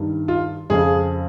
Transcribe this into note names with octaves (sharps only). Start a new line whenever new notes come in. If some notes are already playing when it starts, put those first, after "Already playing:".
Already playing: G2 D#3
F4
F2 C#3 G#4